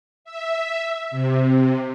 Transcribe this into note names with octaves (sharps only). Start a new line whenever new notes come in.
E5
C3